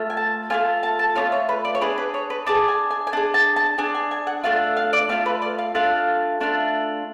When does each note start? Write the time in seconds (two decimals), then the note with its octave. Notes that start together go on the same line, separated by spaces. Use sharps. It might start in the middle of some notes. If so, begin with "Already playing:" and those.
Already playing: A3 F4
0.10 G#5
0.17 A5
0.50 A3 D4 F4 G#5
0.83 A5
0.99 A5
1.15 A3 D4 F4 C#5
1.32 C#5
1.49 B4
1.65 D5
1.75 C#5
1.81 D4 G#4 B4
1.98 B4
2.14 C#5
2.30 B4
2.46 D4 G#4 A5
2.68 G#5
2.91 G#5
3.07 G#5
3.12 D4 G#4 A5
3.34 A5
3.56 A5
3.78 D4 G#4 G#5
3.95 G#5
4.11 G#5
4.27 F#5
4.44 A3 D4 F4 F5
4.77 F5
4.93 D5
5.09 A3 D4 F4 F5
5.26 B4
5.42 D5
5.59 F5
5.75 A3 D4 F4 F5
6.40 A3 D4 F4